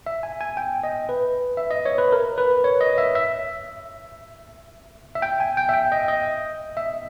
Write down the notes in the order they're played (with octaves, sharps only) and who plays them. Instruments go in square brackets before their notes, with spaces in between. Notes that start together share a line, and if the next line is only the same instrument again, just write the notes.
[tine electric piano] E5
G#5
G#5
G5
D#5
B4
E5
D#5
C#5
B4
A#4
B4
C#5
D#5
E5
E5
E5
G5
G#5
G5
E5
G5
D#5
D#5
E5